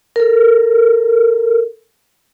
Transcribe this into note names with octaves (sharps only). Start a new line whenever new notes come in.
A4 A#4